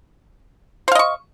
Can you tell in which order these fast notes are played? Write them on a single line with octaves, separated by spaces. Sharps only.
C5 F5 D#5 C#6